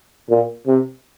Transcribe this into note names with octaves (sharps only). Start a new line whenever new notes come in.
A#2
C3